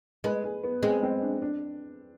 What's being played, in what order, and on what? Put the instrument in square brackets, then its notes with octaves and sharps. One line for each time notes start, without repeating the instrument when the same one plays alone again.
[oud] G#3 [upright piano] B4
[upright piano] G#4
B3
[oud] G#3 [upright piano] C4
[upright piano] C4
D4
D4